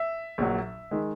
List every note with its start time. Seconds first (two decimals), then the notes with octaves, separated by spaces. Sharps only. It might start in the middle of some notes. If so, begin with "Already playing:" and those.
Already playing: E5
0.38 A#1 A#2 F#3
0.91 D#3 G#3